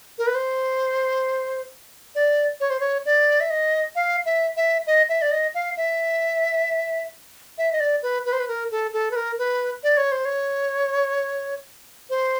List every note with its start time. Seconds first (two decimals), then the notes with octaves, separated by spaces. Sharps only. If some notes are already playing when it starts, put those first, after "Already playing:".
0.18 A#4
0.27 B4
0.35 C5
2.15 D5
2.60 C#5
2.70 C5
2.80 C#5
3.06 D5
3.40 E5
3.50 D#5
3.96 F5
4.26 E5
4.57 E5
4.87 D#5
5.09 E5
5.22 D5
5.32 D#5
5.55 F5
5.77 E5
7.58 E5
7.72 D#5
7.80 D5
8.03 B4
8.26 B4
8.33 C5
8.40 B4
8.48 A#4
8.71 A4
8.93 A4
9.11 B4
9.16 A#4
9.39 B4
9.84 D5
9.97 C#5
10.12 C5
10.25 C#5
12.10 C5